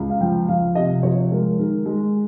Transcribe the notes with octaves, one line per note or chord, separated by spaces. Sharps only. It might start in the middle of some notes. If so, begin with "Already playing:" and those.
Already playing: C#2
F5
F3 G5
F3 F5
C3 D#5
F3 C#5
G#3 A#4
D#3 A#4
G#3